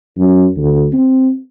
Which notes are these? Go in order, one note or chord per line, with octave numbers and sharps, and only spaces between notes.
F#2
D2
C4